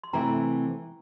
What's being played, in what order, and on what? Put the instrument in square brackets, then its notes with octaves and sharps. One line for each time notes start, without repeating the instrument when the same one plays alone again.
[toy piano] C6
[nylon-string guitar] C3 E3 A3 C4 E4 [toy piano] G5 A#5